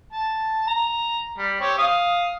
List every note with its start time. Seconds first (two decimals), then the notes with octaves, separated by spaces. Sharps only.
0.13 A5
0.68 A#5
1.38 G3
1.61 C4 G4 C#5
1.78 F5 D#6